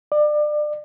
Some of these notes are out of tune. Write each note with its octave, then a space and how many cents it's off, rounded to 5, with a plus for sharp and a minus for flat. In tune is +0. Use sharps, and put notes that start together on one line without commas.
D5 +30